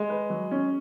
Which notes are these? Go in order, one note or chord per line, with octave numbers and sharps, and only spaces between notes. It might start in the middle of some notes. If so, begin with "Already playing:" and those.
Already playing: G#3
B4
F#3
C#4